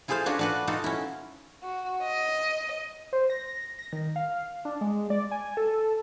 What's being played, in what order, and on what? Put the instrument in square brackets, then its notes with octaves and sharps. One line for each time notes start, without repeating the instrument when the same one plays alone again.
[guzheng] E4 F4 G#4 A4 C5 F5
C#4 D4 F4 F#4 C#5
D4 F#4 B4
D#4 F4 F#4 A4
C#4 E4
[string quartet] F#4
D#5
[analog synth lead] C5
A#6
A#6
D#3
F5
D4
G#3
D5
G#5
A4